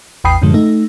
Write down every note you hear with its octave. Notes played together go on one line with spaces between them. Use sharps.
A1 E2 G5 B5 D#6 C7
F#2 A2 D3 F3 G#3
A3 D#4